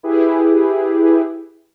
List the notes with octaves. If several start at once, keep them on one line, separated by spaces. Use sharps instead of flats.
E4 G4 G#4 B4